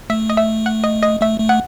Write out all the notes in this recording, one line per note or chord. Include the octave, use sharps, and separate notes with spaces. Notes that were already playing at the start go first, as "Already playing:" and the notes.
A3 E5
D#5
E5
F#5
D#5
D#5
A3 E5
A3
F#5